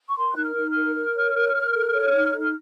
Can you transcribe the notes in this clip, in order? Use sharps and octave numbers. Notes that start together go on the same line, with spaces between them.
C#6
A#4 C6
D#4 F#6
F6
D#4
F6
A#4
A#4
C#5
A#4
A#4
A4
C#5
D#4
A4
F6